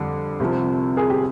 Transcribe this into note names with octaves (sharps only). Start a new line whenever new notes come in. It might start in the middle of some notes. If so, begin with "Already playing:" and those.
Already playing: F2 D3 G3
C2 C3 F3
G#4
G4